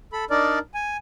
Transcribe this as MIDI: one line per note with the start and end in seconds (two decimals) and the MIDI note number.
0.13 0.25 69
0.13 0.25 83
0.30 0.59 62
0.30 0.59 63
0.30 0.59 70
0.30 0.59 74
0.74 0.97 80